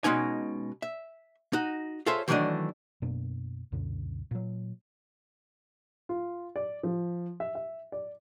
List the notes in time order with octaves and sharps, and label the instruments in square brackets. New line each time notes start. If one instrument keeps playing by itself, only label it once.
[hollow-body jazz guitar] B2 G#3 C#4 D#4 G#5
E5
D#4 F#4
F4 G#4 A4 C5 C#5 E5
D#3 E3 F#3 A3 D4 D#5
[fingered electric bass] F#2 B2 A#3 D4
C#2 F#2 B2 D3
A#2 F#3
[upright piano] F4
D5
F3
E5
E5
D5